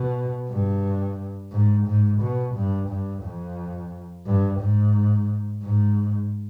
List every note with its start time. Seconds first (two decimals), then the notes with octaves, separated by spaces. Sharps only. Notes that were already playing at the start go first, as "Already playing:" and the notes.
Already playing: B2
0.49 G2
1.52 G#2
1.86 G#2
2.21 B2
2.55 G2
2.89 G2
3.24 F2
4.26 G2
4.60 G#2
5.63 G#2